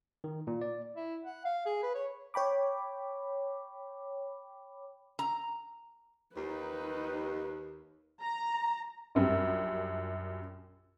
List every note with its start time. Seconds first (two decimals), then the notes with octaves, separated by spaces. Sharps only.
0.24 D#3
0.47 A#2
0.61 D5
0.96 E4
1.24 F#5
1.45 F5
1.66 G#4
1.83 B4
1.95 C#5
2.34 C#5 G5 B5 D6
5.19 A#5
6.36 D#2 D#4 B4
8.21 A#5
9.15 A#1 F#2 G3